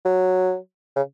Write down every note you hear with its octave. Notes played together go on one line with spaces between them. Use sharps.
F#3
C#3